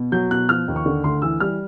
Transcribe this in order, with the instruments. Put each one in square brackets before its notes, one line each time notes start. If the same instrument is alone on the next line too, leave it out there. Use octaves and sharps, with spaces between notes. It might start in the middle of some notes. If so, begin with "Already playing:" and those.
Already playing: [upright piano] B2
F#3 G6
B2 F#6
F3 F6
D#2
C#6
D3
D2 C6
E3 E6
G3 F6